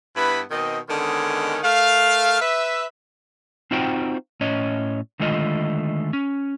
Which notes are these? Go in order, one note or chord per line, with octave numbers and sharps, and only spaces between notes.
G2 B3 E4 B4 B5
B2 D#3 C4 D#5
D3 D#3 G#3 B3 C#4
A3 A#4 F5
B4 E5
C4 D#4 F4 F#4 C5 G5
A2 C#4 C#5 D#5
D3 D#3 G#3 A3 F4 D#5
C#4